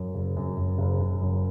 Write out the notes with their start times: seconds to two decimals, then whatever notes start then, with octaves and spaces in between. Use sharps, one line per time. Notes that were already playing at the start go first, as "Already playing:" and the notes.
Already playing: F#2 F#3
0.15 F#1
0.37 F#2
0.57 F#2
0.78 F#1
1.00 F#1
1.21 F#2